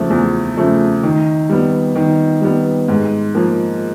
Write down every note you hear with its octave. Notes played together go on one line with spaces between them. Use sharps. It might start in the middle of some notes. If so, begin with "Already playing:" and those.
Already playing: E2 C#3 F3 A3
E2
C#3 F3 A3
D#3
G3 B3
D#3
G3 B3
G#2
F3 A#3